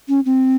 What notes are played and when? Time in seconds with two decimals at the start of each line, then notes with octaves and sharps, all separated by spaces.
0.09 C#4
0.26 C4